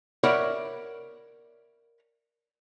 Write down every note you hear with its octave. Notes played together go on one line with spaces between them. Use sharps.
A#4 C#5 D5 E5 F#5 B5